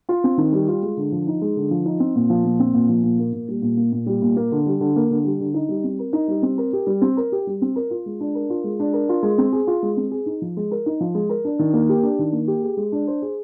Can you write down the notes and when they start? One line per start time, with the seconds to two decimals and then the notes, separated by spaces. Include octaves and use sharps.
0.09 F4
0.24 C4
0.38 D#3
0.52 G3
0.68 F4
0.82 G#3
0.97 D3
1.12 F3
1.27 D#4
1.41 G#3
1.56 D3
1.71 F3
1.86 D#4
2.00 C4
2.15 A#2
2.30 F3
2.45 A#2
2.60 C4
2.74 A#2
2.89 F3
3.03 A#2
3.19 A#3
3.33 A#2
3.48 G3
3.62 A#2
3.77 A#3
3.92 A#2
4.06 G3
4.22 A#2
4.37 A#3
4.52 D3
4.66 G3
4.80 D3
4.96 A#3
5.11 D3
5.25 G3
5.40 D3
5.54 D#4
5.69 G3
5.84 C4
5.99 A#4
6.13 D#4
6.28 G3
6.42 C4
6.58 A#4
6.73 G4
6.87 G3
7.02 C4
7.17 A#4
7.32 G4
7.47 G3
7.62 C4
7.76 A#4
7.91 F4
8.06 G#3
8.20 D4
8.35 A#4
8.50 F4
8.64 G#3
8.80 D4
8.93 A#4
9.09 F4
9.23 G#3
9.38 C4
9.53 G#4
9.67 F4
9.83 G#3
9.97 C4
10.11 G#4
10.26 D#4
10.42 F3
10.57 G#3
10.71 A#4
10.86 D#4
11.00 F3
11.15 G#3
11.29 A#4
11.45 D4
11.59 D#3
11.73 A#3
11.89 G4
12.03 D4
12.19 D#3
12.32 A#3
12.48 G4
12.62 G#4
12.77 G#3
12.92 D4
13.07 C5
13.22 G#4